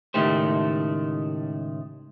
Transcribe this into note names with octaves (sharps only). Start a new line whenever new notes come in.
C#2 A2 D#3 A3 G4 C5